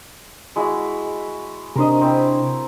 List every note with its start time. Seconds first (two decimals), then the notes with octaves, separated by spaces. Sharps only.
0.56 G#3 E4 F#4
1.76 C3 D4 A#4 C5 D#5
2.01 C4 E4